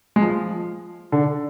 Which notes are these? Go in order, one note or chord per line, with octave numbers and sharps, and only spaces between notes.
G#3
F3
D3